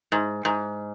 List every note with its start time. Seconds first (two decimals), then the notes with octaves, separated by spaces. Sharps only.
0.12 G#2
0.45 G#2